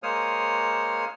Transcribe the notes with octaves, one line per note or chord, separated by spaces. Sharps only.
G#3 A#3 C5 C#5 D#6 F6